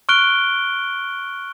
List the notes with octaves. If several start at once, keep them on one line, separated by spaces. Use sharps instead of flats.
C#6 F6 F#6 D7 G7